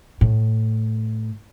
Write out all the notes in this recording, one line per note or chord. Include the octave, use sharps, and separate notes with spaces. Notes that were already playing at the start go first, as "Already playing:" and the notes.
A2